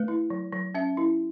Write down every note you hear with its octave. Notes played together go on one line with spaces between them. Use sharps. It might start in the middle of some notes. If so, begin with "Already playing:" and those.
Already playing: A3 B4
E4
F#3
F#3
C#4 E5
E4